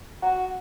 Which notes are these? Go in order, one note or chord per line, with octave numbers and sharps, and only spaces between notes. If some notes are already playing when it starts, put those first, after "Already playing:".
F#4